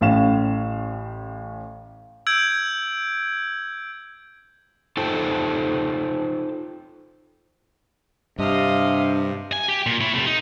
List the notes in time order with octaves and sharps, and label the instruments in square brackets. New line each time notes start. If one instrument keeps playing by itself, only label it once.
[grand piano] A1 A2 C#4 F5 E7
[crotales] E6 G6 G#6 D7
[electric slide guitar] D#4 F4 A4 C5 G5 A5
[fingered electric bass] G2 [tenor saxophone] C3 [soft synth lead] D4 [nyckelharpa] D#5 F5
[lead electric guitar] G#5
G4
A#2
E4 C#5
C3 A3
D#4